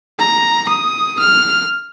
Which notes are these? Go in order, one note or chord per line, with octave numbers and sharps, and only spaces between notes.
A#5
D#6
F6